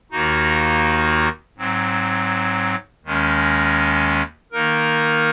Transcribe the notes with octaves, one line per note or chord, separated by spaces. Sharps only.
D#2 D#3 A#3 D#4 F#4
G#2 F#3 C4
D#2 D#3 G#3 C#4
D#3 A#3 D#4 A#4